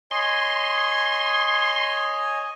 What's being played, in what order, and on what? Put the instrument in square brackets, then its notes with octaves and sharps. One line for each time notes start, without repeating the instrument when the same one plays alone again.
[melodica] C#5 D#5 G#5 [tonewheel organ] C6